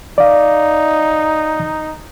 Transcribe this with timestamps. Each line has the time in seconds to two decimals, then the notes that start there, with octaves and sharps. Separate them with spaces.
0.18 D#4 D5 F5